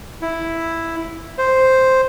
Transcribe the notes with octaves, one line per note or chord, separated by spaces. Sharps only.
E4
C5